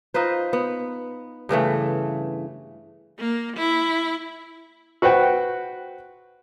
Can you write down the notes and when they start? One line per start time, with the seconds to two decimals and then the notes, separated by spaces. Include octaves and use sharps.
0.14 D#4 F4 B4 C5
0.53 B3
1.49 G2 C#3 E3 A3
3.19 A#3
3.57 E4
5.02 F#4 B4 C5 F#5 G5